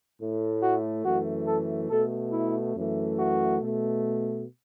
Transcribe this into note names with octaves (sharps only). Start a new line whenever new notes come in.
A2 A3
F#4
F#2 E3 A3 F#4
A4
B2 A3 A4
E4
F#2 E3 A3
F#4
B2 A3